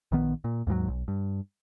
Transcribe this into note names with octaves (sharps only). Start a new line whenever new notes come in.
A#1 D#3 B3
A#2
D#2 G#2 E3 F#3
B1
G2